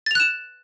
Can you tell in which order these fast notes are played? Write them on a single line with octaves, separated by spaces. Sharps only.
A6 F7 F#6 E7